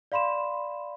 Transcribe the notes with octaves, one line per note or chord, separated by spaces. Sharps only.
D5 F5 B5 C6 E7